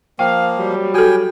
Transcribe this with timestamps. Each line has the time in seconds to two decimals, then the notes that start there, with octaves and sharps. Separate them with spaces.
0.19 F3 A#3 F5 G5
0.57 F#3 G3
0.94 F#4 A4 G5 G#5